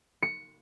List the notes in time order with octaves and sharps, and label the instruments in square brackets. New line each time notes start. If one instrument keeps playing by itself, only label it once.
[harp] C#7